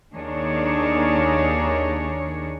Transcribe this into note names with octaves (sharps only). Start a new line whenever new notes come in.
D#2 D#3 A#3 D4 G#4 C#5